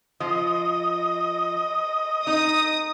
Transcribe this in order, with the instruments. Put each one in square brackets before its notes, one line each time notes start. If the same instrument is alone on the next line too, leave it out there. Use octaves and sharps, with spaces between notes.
[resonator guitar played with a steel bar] F3 [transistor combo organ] D#5
[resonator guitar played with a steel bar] D#4 [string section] D#6